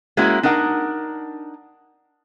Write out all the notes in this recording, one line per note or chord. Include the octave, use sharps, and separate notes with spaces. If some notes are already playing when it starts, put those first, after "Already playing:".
G#3 A#3 C#4 E4 F#4
D4 D#4 A#4 F#5